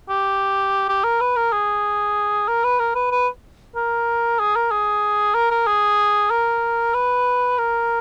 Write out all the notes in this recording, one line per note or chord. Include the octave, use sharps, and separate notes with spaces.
G4
G4
A#4
B4
A#4
G#4
A#4
B4
A#4
B4
B4
A#4
G#4
A#4
G#4
A#4
A#4
G#4
A#4
B4
A#4